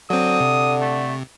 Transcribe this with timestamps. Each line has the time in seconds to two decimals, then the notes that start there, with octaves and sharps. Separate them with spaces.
0.10 D3 F#3 C4 D#6
0.40 C3
0.81 A3